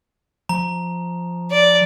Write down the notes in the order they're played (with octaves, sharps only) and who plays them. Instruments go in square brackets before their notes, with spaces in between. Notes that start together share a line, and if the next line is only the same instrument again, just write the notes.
[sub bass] F3 [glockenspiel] A#5
[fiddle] D5